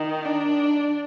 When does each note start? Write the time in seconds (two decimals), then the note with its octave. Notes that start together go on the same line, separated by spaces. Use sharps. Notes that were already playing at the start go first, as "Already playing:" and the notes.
Already playing: D#3
0.25 D4